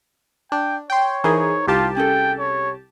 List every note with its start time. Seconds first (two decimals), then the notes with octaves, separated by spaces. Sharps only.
0.52 D4 G5
0.90 C#5 G5 C6
1.24 E3 D#4 G#4 A#4 C5
1.68 C2 F4 G4 A5
1.97 C#4 G#4 A4 G5
2.39 C#5